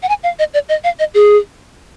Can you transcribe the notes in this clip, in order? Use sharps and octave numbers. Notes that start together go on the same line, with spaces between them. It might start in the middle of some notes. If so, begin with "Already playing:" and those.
F#5
G#5
F5
D#5
D5
D#5
F5
D#5
G#4